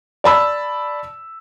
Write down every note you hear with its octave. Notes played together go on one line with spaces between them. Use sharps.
D5 A5 B5 E6